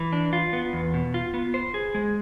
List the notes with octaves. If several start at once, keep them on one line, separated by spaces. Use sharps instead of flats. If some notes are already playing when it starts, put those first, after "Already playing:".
Already playing: E3
D4
F4
B3
E2
B2
F4
B3
C5
G#4
G#3